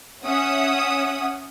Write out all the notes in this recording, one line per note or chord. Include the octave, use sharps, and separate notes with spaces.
C#4 E5 F#5 D#6